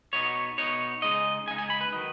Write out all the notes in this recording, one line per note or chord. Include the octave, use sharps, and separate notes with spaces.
B2 B3 D#4 C#5
B2 B3 D#4 C#5
C#3 G#3 D#4 D#5
C#3 G#3 D#4 G#5
G#5
B5
B4
D#3 F#3 D#4